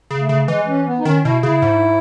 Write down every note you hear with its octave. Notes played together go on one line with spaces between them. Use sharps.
C#3
A3
C#3
E3 G#3
C#4
B3
D#4
D#3 C#4
B2 E4
C#3 E4
G#2